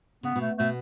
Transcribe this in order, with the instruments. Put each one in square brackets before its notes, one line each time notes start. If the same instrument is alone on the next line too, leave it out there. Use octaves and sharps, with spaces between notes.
[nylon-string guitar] C#3 [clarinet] B3
[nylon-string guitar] B2 [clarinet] A3
[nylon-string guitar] B2 [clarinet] A3